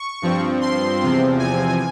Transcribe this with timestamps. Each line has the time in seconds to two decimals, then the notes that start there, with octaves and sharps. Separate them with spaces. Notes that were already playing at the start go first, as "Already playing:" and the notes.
Already playing: C#6
0.22 G2 F3 C4
0.61 C6
1.00 E2 C3 F3 C4
1.39 G#5